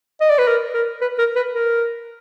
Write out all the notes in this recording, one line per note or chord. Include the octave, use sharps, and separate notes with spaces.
D#5
D5
B4
A#4
A#4
B4
A#4
B4
A#4